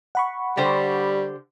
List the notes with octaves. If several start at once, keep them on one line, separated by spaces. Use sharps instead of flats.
F#5 B5 C#6
D3 G3 G4 C5